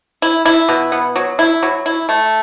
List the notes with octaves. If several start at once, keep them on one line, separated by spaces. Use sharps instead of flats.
E4
E4
B2
B3
F#3
E4
F#3
E4
A3